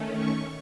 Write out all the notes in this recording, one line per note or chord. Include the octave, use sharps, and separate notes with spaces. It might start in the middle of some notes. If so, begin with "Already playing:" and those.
Already playing: D#3 A3 C#4
C#6